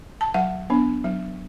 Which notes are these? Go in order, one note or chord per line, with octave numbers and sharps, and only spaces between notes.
A5
F#3 F#5
B3 D4
F#3